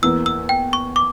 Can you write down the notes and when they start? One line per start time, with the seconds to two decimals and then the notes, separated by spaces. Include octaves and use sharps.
0.02 E2 E3 A#3 E6
0.26 E6
0.49 G5
0.73 C#6
0.96 D6